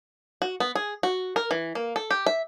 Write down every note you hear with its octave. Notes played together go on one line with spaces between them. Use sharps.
F#4
B3
G#4
F#4
A#4
E3
A#3
A4
G4
E5